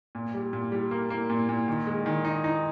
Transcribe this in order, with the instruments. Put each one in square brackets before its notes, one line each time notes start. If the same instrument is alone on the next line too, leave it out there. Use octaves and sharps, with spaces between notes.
[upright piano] A#2
G3
A#2
G3
A#3
A#3
A#2
A#2
D#3
G#3
D#3
D#4
D#4